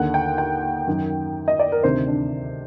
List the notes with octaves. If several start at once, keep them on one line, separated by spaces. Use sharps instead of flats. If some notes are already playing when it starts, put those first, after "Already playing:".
Already playing: D#2 D3 F#5
G5
G5
F#2 D#3
D#5
D5
A#4
D2 C3 D#3 C5
D4